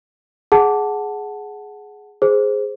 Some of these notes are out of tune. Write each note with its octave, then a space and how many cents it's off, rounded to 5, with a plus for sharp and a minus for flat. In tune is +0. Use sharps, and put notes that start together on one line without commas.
G#4 +10 F#5 +0 A5 +0
G#4 +0 C5 +0